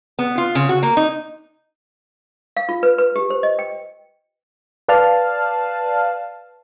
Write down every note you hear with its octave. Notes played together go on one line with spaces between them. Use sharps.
B3
F4
C#3
F#4
A#3
D#4
F5
F4
B4
B4
G4
C5
D#5
G5
B4 D5 F5 A5 F6